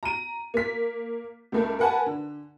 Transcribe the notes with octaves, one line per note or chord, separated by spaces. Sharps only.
A#5 D#7
A#3 B6
C#2 A3 A#3
A#4 B4 F#5 G#5 A5
D3